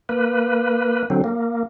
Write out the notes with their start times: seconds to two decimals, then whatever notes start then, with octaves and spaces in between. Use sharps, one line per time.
0.09 A#3 B4
1.10 D3 F#3 C4
1.24 A#3